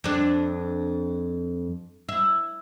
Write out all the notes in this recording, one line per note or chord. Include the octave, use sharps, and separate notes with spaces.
F2 D4
E4